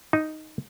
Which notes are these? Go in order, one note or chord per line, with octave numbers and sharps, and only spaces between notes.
D#4